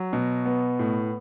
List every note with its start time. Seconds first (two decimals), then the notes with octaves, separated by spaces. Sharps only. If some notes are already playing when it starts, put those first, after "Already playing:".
Already playing: F#3
0.13 B2
0.46 B3
0.79 A2